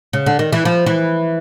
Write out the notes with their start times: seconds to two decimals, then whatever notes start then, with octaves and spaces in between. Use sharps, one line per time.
0.13 C#3
0.26 D3
0.39 D#3
0.53 E3
0.65 F3
0.86 E3